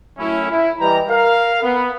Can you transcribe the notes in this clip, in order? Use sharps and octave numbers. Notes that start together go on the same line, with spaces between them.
F#2 A2 C#4 E4
E4
E3 G3 B4 D#5 G5 A#5
A#4 F5
B3